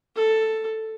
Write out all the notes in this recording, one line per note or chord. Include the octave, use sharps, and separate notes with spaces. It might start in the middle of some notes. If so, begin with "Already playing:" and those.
A4